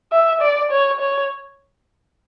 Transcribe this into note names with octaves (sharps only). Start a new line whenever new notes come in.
E5
D5
C#5
C#5